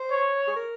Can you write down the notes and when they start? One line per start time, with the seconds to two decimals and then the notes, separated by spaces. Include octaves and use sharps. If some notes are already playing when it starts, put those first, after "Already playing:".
Already playing: C5
0.11 C#5
0.47 G#4
0.56 A#4